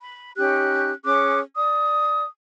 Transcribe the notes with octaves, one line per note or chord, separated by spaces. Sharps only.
B5
C#4 D#4 G4 F#6
C#4 G#4 D6 F#6
D5 D#6